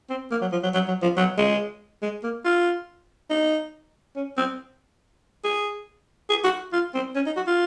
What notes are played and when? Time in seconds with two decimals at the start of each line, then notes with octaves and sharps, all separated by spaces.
0.10 C4
0.31 A#3
0.41 F#3
0.52 F3
0.63 F#3
0.74 F#3
0.88 F#3
1.02 F3
1.17 F#3
1.38 G#3
2.02 G#3
2.23 A#3
2.45 F4
3.30 D#4
4.16 C#4
4.37 C4
5.44 G#4
6.30 G#4
6.44 F#4
6.73 F4
6.94 C4
7.15 C#4
7.26 D#4
7.36 F#4
7.47 F4